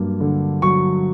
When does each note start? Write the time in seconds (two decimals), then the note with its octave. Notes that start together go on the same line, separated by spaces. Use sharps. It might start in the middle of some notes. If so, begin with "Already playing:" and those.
Already playing: G2 F#3 A#3
0.20 D3
0.62 F#3 C#6